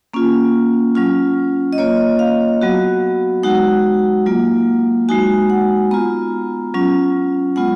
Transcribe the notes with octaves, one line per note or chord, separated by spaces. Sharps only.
A#3 C#4 F4
F#3 C#4 F4
D#5
A#3 F4 C#5
F5
F#3 B3 F#4
G#3 D#4 F#4 F#5
F#3 A#3 F4
G#3 D#4 F#4 G#5
F#5
B3 F4 A#5
F#3 C#4 F4
G#3 B3 F4 F#5